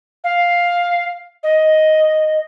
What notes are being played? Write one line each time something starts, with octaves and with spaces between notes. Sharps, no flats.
F5
D#5